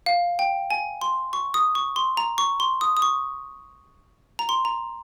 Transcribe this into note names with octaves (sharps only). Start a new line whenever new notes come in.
F5
G5
G#5
C6
C#6
D#6
C#6
C6
A#5
C#6
C6
D#6
D#6
C#6
A#5
C6
A#5